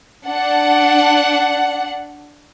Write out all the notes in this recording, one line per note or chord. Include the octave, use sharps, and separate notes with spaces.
D4 F#5